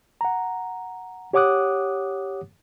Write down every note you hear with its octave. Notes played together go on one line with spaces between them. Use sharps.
F#5 A#5
G4 C#5 F#5 D6 D#6 F#6